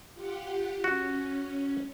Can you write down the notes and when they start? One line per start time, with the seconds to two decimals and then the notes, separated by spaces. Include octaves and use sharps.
0.14 F4 G4 F#5
0.84 C#4 F#4